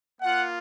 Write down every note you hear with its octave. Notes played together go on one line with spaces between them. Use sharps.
A#3 F4 F#5